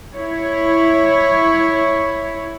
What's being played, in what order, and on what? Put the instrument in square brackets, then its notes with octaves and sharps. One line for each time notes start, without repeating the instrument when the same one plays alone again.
[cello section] E4 C#5